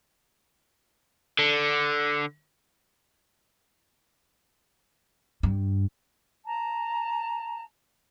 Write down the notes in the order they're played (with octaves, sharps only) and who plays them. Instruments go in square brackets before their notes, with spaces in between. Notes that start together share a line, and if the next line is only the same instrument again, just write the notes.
[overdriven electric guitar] D3
[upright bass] G2
[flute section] A5 A#5